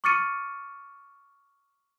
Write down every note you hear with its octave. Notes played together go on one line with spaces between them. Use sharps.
C#6 D6 F6 A6 C#7 D#7